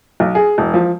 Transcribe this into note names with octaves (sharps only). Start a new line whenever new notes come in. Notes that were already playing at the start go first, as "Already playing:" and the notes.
B1
G#4
E1
F3